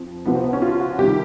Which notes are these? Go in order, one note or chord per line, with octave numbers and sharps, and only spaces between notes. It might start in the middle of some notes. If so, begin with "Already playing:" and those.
Already playing: F2 F3
C#2 C3 F3 B3
C4
B3
C#4
F4
F#4
C2 C3 D#3 G4